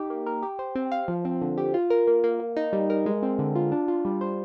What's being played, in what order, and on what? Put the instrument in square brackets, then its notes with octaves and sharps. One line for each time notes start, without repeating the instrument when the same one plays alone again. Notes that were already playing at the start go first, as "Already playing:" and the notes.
Already playing: [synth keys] D#4 G4
A#3
A#4
G4
C5
C4
F5
F3
C4
D3
G4
F4
A#4
A#3
A#3
A#3
D#4
G3
A#4
G#3
C4
D3
F4
D4
F4
G3
C5